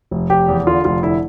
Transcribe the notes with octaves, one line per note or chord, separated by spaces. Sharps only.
F1
F1 G4
E2
D3 F4
F1 F4
D3 E4